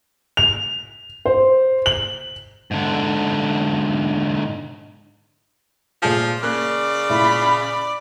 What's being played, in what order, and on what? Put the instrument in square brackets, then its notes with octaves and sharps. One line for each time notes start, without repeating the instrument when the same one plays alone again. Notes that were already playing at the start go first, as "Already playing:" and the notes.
[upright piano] F7
C5
F#7
[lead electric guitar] G#2 D3
[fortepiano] A#2 G#4 G#5 [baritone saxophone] F3
[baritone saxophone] C#3 [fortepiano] A#3 F#6 [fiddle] D5
[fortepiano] A#2 E4 F4 [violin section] B5